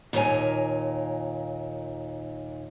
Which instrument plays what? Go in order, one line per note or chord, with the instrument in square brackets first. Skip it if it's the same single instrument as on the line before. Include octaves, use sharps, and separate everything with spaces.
[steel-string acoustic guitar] D#2 A#2 A#3 C#5 G#5